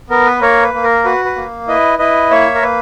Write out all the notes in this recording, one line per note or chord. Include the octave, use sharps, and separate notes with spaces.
B3 A#4
B4
A#3 A#4 C#5
B4
A#3
A#4
F#4 B4
B4
A#3
E4 B4 D#5
E4 B4 D#5
A#3 C#5 E5
A#4
A#3 B4